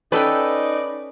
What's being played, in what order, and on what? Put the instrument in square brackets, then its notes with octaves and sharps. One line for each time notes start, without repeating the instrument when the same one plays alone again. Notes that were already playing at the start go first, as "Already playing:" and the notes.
[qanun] C#4 A4 G5 [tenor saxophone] D#4 [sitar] B4 [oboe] D5